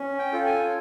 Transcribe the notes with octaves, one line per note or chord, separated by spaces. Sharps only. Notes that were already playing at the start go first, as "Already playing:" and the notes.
Already playing: C#4
G5
F4 A4
G#5